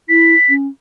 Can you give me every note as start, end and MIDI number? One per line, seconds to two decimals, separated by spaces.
0.09 0.34 64
0.09 0.54 95
0.49 0.67 61